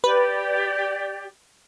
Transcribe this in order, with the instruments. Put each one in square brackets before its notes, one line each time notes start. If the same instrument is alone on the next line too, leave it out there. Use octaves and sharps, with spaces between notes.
[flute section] G4 D5 [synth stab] B4